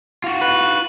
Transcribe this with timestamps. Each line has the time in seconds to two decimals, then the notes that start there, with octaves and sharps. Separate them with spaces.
0.24 F4 F#4
0.41 B4